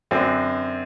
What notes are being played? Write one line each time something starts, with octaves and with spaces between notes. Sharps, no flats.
F#2 D3 F#3 C4